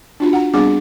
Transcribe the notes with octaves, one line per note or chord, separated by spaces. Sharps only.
D4 F4 F#4
F#5 A#5
G3 B3 C4 D4 G#4 D6